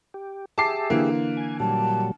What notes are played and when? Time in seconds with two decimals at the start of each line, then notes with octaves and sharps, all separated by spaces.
0.14 G4
0.58 G4 G#4 E5 A5 D6 C7
0.90 D3 E3 A#3
1.37 G#5
1.60 A#2 F#3 G3 A5